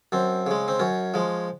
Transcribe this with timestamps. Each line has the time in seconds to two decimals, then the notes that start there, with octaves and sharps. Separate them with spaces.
0.12 F#2 C4
0.47 C#3 G#3
0.68 C4
0.79 F#2 C#4
1.14 F3 G#3